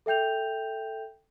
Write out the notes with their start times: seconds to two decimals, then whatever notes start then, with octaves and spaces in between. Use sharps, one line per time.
0.06 A4 E5 G5 G6 F7